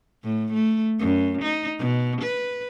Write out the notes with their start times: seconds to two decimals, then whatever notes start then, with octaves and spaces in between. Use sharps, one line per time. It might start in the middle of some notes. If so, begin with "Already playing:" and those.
0.24 A2
0.53 A3
1.00 F#2
1.42 D#4
1.79 B2
2.22 B4